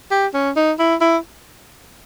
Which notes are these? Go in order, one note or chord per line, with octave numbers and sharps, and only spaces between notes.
G4
C#4
D#4
E4
E4